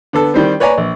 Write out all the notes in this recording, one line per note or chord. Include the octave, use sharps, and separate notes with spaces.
D3 B3 A4
D#3 G3 C4
B4 C#5 D5 G#5 A#5
A#1